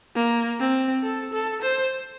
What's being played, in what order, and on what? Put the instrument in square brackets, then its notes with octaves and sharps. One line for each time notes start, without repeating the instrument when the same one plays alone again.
[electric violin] A#3
C4
A4
A4
C5